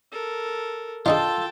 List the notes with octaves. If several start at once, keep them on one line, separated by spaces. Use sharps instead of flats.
A4 A#4
D4 D#4 F4 G#4 A4 G5 A5